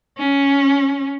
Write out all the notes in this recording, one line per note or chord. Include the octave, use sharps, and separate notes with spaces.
C#4